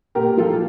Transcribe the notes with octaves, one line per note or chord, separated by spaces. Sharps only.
A#2 G4 A#4
F3 F4 A4